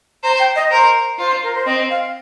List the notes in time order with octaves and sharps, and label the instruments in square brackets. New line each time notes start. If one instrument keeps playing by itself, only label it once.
[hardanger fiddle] C5 [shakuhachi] A#5
[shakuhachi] G5
D#5
[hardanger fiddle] A#4 [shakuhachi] C5
[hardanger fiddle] F4 [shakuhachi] C5
[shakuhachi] A#4
C5
[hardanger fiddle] C4 [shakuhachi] D#5
[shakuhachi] F5